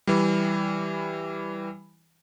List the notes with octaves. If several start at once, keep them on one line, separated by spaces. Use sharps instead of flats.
E3 G3